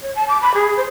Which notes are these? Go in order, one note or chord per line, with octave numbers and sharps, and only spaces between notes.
C#5
A5
D6
B5
G#4
C5